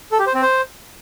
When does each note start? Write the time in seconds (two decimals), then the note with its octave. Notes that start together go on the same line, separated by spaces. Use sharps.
0.12 A4
0.19 G4
0.27 C5
0.34 C4
0.42 C5